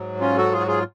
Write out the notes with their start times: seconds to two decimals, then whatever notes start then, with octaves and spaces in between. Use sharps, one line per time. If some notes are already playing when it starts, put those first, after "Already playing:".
Already playing: G#2 F#3
0.21 C#4 F4
0.37 F#4 A4
0.52 F4 G#4
0.60 F#4
0.67 F4 G#4